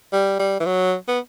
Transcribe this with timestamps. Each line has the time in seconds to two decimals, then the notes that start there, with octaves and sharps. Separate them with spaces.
0.13 G3
0.39 G3
0.60 E3
0.66 F#3
1.08 B3